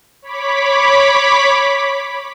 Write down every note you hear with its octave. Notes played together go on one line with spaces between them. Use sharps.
C#5 B5 D6 B6